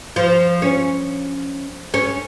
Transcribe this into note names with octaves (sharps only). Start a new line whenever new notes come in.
F3
C#4
C#4